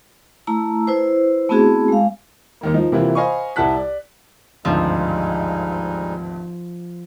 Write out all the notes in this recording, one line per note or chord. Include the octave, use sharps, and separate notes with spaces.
A3 E4 A#5 E6
E4 B4 C5
A3 B3 C4 E4 F#4 G#4
G#3 F5
D#2 D#3 A#3
F3 D#4
C3 E3 A#3 E4 F4 B4
C5 D#5 F5 G#5 B5 C#6
C2 E4 F#5 A5 F#6 B6
D5
G#1 D2 G2 F3 G3 G#3 D#4